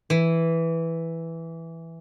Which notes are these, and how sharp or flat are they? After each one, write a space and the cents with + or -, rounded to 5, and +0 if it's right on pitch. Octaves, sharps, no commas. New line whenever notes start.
E3 +0